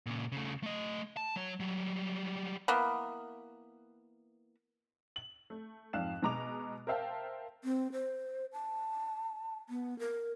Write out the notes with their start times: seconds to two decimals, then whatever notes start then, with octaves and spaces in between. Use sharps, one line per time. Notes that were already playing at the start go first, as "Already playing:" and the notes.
0.06 A#2 C#3
0.32 C#3 A3
0.63 A3 D#5
1.17 A5
1.36 F#3 C#5
1.60 F#3 G3
2.68 E3 A#3 B3
5.16 F#7
5.50 A3
5.93 F2 G#2 F5 F#6 E7
6.22 B2 G#3 A#5 D6 F7
6.87 A#4 C5 E5 F5 G5 A5
7.64 C4
7.92 C5
8.53 A5
9.69 B3
9.99 A#4